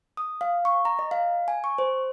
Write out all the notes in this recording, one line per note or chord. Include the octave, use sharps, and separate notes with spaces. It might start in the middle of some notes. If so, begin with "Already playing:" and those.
D#6
F5
C#6
A#5
D#5
F5
G#5
C#6
C5